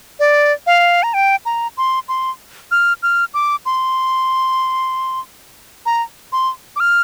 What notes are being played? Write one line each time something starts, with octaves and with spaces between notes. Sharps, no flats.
D5
F5
A#5
G5
A#5
C6
C6
F6
F6
D6
C6
A#5
C6
D6
F6